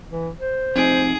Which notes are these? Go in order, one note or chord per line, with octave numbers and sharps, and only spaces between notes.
E3
C5
F2 C3 C4 D#4 G#4 D7